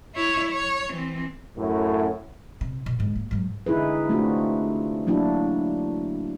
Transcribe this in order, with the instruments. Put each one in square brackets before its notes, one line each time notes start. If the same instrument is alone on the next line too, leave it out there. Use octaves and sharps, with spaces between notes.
[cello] E4 C#5
C#5
E3 C4
[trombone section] F#2 A2
[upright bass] C3
B2
G#2 D3
A#3
G#2 F#3
[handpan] D3 D#4 E4 G#4 B4
A3 C4 D4 F4 F#4
F#3 A#3 D4 E4 F#4